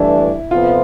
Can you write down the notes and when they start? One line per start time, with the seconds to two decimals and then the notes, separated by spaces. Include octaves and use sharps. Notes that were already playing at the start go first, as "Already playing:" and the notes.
Already playing: G2 E3 A3 D4 E4
0.51 F2 C3 F3 B3 F4